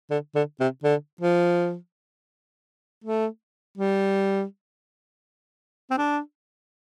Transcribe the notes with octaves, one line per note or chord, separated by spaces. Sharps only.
D3
D3
C3
D3
F3
A3
G3
C4
D4